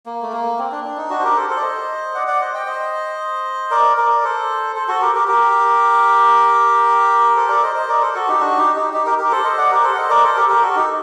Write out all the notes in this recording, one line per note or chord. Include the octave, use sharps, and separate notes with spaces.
A#3
A3
A#3
C4
D4
D4
D#4
D4 F#4
C5
G4 A#4
A4 C5
A4 C5
D5
C5 D#5
D5 F#5
D5 F#5
C5 D#5
D#5 G5
C5 D#5
A#4 D5
A#4 D5
A4 C5
A4 C5
F#4 A4
G4 A#4
G4 A#4
G4 A#4
A4 C5
A#4 D5
C5 D#5
C5 D#5
A#4 D5
A4 C5
F#4 A4
D#4 G4
D4 F#4
D#4 G4
D#4 G4
D#4 G4
G4 A#4
G4 A#4
A4 C5
C5 D#5
D5 F#5
G4 A#4
A4 C5
F#5
C5 D#5
A#4 D5
A4 C5
G4 A#4
G4 A#4
F#4 A4
D#4 G4